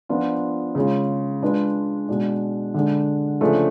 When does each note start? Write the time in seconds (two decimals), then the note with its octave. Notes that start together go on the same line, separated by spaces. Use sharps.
0.09 F3 B3 D4 F4
0.75 C#3 G#3 C#4 F4
1.42 G#3 D4 F4 B4 D5
2.09 B2 G#3 D4
2.74 D3 G#3 D4
3.41 C#3 F3 A3 D4 G#4